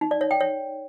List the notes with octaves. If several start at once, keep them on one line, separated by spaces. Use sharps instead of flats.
D#4
D5
C#5
G5
C#5